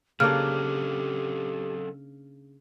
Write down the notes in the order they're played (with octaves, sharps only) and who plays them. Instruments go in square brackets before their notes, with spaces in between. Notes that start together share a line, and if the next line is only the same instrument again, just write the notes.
[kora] C#3 A#3 D4 [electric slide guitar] F#3 C4 A4 [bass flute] G4 [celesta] F6